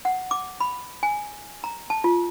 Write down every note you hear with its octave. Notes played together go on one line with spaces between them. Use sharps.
F#5
D6
B5
G#5
A#5
A5
F4